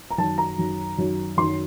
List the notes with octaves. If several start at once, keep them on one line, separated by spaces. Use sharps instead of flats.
A#5
F#2 D#3 F#3 A5
A#5
F#2 D#3 F#3
F#2 D#3 F#3
F#2 D#3 F#3 C6